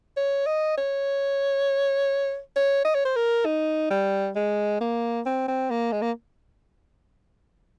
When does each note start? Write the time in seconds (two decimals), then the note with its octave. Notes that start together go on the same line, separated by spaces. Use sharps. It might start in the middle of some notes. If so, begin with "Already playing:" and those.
0.17 C#5
0.46 D#5
0.78 C#5
2.56 C#5
2.85 D#5
2.95 C#5
3.05 C5
3.16 A#4
3.45 D#4
3.90 G3
4.36 G#3
4.81 A#3
5.26 C4
5.48 C4
5.70 A#3
5.92 G#3
6.02 A#3